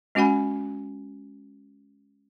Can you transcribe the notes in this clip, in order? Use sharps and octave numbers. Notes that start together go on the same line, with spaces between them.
G#3 C#4 F#4 F#5 G#5 B5